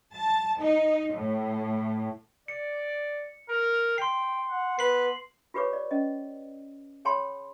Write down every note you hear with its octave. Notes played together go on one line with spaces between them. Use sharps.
A5
D#4
A2
D5 C#7
A#4
G5 C6 C7
F#5
B3 B4 C7 F#7
F4 G4 B4 C#5 D6
D5
C#4 D#5
G#4 C#5 G5 A5 B5 C6